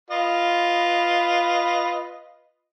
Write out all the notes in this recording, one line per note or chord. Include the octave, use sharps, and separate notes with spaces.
F4 B4 D#5